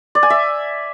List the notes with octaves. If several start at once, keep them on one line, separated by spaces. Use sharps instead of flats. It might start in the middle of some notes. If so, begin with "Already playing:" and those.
D5
G#5
E5